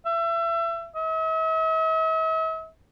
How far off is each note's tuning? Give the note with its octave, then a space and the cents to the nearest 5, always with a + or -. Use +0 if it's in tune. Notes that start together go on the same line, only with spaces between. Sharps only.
E5 +30
E5 -45